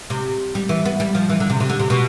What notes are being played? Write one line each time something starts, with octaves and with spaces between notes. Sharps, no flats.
C3
G3
E3
B3
G3
F3
E3
D3
C3
C3
D3
C3
B2